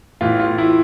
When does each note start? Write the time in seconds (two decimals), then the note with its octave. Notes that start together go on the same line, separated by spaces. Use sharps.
0.21 A2 E3 F4
0.40 F4
0.58 E4